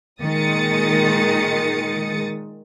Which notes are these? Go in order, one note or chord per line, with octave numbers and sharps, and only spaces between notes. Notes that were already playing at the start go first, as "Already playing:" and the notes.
A#2 D#3 G#3 D#6 A6 C#7